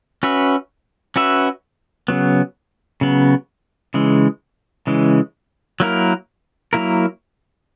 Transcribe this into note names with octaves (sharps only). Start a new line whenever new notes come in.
C#4 F#4 B4 E5
C#4 F#4 B4 E5
C#3 F#3 B3
C#3 F#3 B3
C#3 E3 G#3
C#3 E3 G#3
F#3 A#3 E4 A#4
F#3 A#3 E4 A#4